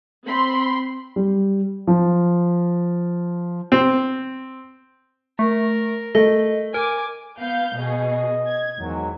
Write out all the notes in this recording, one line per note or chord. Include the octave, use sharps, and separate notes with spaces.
C4 B5 C6
G3
F3
C4
A3 A#4
A3 D#5
A#4 G#5 D6
B3 F5 G6
B2 G#4 D#5
G#6
E2 G#2 D#3 F#3